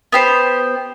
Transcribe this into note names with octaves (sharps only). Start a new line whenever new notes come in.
B3 G4 C5